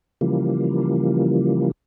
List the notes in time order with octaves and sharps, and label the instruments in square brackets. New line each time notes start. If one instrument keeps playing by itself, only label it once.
[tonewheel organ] C#3 E3 F3 G3 A#3